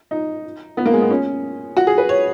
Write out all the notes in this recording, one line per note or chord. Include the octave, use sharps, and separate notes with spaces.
D#4
B3
A#3
G#3
B3
C#4
F#4
G#4
B4
C#5